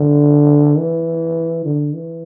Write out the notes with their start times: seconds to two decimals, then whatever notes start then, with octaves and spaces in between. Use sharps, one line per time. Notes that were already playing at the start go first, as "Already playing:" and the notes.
Already playing: D3
0.78 E3
1.65 D3
1.94 E3